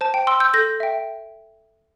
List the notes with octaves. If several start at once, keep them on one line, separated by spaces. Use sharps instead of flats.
C5 A5
G5
G5 C6 E6
E6 G6
A4 G6 A#6
E5 G5